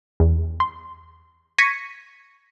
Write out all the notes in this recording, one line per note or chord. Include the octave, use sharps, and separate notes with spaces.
E2
C6
C#6 G#6 A#6 B6 C#7 D#7